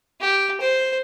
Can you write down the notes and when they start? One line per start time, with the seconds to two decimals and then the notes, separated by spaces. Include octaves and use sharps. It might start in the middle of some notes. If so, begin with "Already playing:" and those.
0.21 G4
0.61 C5